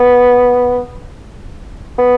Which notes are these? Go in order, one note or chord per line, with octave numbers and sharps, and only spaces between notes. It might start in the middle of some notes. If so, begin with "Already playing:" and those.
Already playing: B3
B3